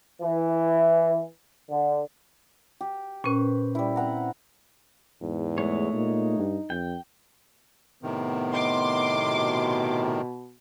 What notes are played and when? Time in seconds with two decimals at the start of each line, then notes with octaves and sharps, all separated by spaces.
0.22 E3
1.70 D3
2.81 G4
3.24 A#2 C#4 B4 C5
3.75 G3 E4
3.96 C4 F#5 A#5
5.22 E2 G#2
5.58 G#3 A3 C#5
5.93 A#2 D#4
6.38 G2
6.70 F2 G5
8.03 A2 C3 D#3 B3
8.53 D#5 C6 D6
9.26 B2